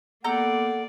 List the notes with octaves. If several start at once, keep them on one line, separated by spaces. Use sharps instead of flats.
A#3 B3 A4 D5 F#5 A#5 G6